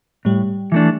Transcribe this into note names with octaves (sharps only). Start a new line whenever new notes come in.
A2 G3
E3 A3 D4